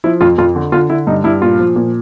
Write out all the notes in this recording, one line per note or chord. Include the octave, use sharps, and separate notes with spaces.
F3 E4
F2 F4
F2 F4
D3
D3 F4
D3 E4
G2 D#4
G2 E4
A#2 F4
F3
A#2